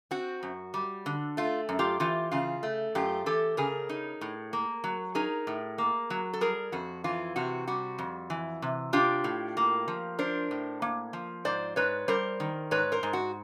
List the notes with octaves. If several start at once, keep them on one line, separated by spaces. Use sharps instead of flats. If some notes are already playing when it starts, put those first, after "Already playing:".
C4 F#4
F#2
G3
D3
A3 F4
F#2
F4 G4
E3 F4 G4
C#3 F4
A3
F#2 F4 G4
E3 G4 A4
C#3 G#4 A#4
D#4
A2
A#3
F#3
D#4 G#4 A#4
A2
A#3
F#3
A4
G3 G#4 A#4
F2 F#4
E3 F4
C3 F#4
G3 F#4
F2
E3
C3
D4 F4 G4
A2
A#3
F3
D4 A#4 C5
A2
A#3
F3
G#2 C5 D5
G#2 B4 C#5
G3 A#4 C5
D#3
G#2 B4 C#5
A#4 C5
G#2
F#4